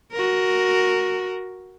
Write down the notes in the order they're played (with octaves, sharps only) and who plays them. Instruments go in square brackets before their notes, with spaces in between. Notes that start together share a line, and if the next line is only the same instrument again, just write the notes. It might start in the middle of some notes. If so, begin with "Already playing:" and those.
[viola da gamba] F#4 A#4